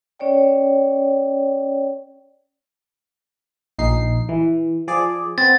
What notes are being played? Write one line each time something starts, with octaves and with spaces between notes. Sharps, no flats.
C#4 C#5 D5 G5
A#1 D#4 C7
E3
F3 G#4 D5
B3 C4 A6